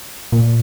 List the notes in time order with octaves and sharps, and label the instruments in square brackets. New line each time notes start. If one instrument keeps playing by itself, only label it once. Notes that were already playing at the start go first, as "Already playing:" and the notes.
[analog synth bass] A#2